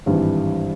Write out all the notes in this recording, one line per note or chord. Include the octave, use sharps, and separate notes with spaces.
G#1 G2 E3